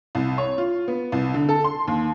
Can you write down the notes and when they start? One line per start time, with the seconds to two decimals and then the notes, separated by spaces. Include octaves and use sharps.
0.15 C2
0.38 C#5
0.58 F4
0.88 B3
1.12 C2
1.34 D3
1.49 A4
1.64 C6
1.87 D#2